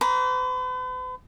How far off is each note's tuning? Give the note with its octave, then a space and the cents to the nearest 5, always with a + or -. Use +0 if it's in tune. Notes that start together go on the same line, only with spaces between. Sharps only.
B4 +45 A#5 +45 D6 -45